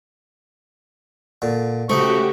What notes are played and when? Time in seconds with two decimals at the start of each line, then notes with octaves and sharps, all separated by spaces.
1.42 A#2 D3
1.89 C#3 A3 C4 D#4 F#4 G4 B5 C#6